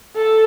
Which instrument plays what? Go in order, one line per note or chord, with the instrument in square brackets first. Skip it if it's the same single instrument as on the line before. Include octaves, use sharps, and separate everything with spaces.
[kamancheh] A4